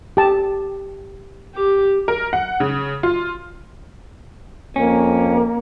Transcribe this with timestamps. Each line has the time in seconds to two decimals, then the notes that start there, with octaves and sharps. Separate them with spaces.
0.17 G4 A5
1.54 G4 D6
2.08 A#4
2.33 F#5
2.60 C#3
3.03 F4
4.76 F2 A#3 C#4